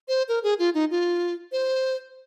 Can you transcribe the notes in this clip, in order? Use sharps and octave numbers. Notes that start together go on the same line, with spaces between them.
C5
A#4
G#4
F4
D#4
F4
C5